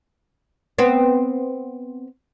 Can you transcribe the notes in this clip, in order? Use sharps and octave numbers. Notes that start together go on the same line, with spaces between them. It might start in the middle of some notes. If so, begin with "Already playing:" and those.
B3 C4